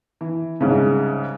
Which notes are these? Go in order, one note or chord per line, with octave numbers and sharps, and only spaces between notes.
E3
C2 G#2 C#3